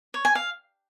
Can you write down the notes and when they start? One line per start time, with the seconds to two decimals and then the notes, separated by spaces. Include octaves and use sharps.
0.14 C#5
0.25 G#5
0.35 F5